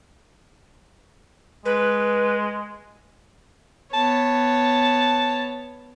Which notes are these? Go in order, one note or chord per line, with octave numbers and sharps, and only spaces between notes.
G#3 B4
B3 C#5 A5